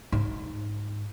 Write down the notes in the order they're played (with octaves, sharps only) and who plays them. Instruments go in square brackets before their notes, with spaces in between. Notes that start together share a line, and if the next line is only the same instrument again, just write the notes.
[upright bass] G#2 D#4